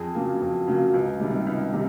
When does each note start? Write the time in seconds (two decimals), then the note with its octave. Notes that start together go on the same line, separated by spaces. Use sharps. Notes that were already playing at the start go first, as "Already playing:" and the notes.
Already playing: F2 G#4
0.15 C#3 F#3 A#3
0.41 F2
0.67 C#3 F#3 A#3
0.94 C#2
1.20 C3 D#3 G3
1.46 C#2
1.73 C3 D#3 G3